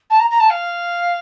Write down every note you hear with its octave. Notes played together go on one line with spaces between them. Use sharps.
A5
A#5
A#5
A5
F5